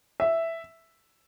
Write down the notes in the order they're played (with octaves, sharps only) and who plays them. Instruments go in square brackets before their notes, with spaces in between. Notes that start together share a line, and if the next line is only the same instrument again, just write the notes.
[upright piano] E5